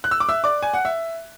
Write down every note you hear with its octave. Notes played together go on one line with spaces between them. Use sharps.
F#6
E6
D6
E5 E6
D5 D6
G#5
F#5
E5